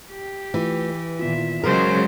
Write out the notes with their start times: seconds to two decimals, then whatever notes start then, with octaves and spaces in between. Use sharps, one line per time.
0.11 G4
0.54 E3 A3 F4
0.90 B4
1.19 A#2 D#3 B3 F4 E5
1.64 C#3 F#3 G#3 G#4 A#4 C5